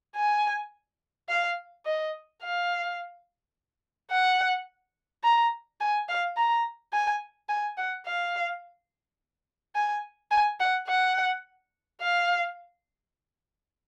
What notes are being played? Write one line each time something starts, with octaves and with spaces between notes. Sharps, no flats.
G#5
F5
D#5
F5
F#5
A#5
G#5
F5
A#5
G#5
G#5
F#5
F5
G#5
G#5
F#5
F#5
F5